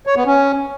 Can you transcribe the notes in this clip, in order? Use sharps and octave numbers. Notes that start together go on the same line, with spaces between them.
C#5
B3
C#4